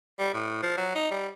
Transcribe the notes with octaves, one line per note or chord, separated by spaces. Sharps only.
G3
A2
F3
F#3
D#4
G3